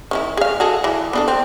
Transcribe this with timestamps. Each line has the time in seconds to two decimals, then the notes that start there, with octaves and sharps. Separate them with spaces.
0.11 D#3 C#4 E4
0.37 G#4 F5
0.60 F#4 G#4 A4
0.84 E3 E4
1.13 B3 D4 A4
1.28 C4